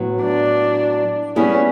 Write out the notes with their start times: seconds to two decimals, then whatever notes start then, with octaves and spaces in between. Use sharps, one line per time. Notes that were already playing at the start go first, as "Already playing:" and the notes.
Already playing: A2 F#3 B3
0.22 D4
1.36 G3 B3 C#4 E4 G#4